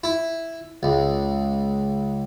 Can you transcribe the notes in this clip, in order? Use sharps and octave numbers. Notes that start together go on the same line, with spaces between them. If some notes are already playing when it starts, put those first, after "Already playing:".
E4
C#2